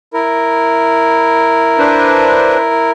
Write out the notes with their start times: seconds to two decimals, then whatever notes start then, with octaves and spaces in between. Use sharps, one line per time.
0.14 E4 A#4
1.78 D4 B4 C5